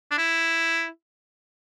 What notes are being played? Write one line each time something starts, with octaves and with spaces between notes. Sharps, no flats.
D4
E4